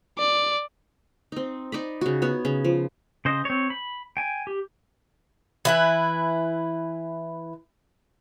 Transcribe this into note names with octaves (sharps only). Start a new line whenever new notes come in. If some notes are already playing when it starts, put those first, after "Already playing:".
D5
C4 D#4
D#4 D5 B5
C#3 F#4
B3 F#4 C#5
C#3
F3
C#3 C5 D#5
C4 C#5
B5
G5 G#5
G4
E3 E4 B4